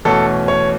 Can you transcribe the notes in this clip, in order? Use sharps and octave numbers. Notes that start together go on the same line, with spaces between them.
E2 B2 A3 C#4 A4
C#5